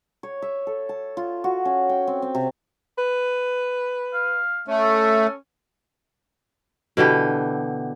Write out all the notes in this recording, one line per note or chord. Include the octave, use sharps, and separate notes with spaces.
C#5
E5
A4
A5
F4
F#4
C#4
G5
C4
C4
C3
B4
F5
A3 C#4
A4
B2 D3 E3 G4